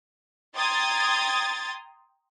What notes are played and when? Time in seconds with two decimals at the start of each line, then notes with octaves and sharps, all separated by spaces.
0.56 G5 A#5 C6 D#6 G#6 A6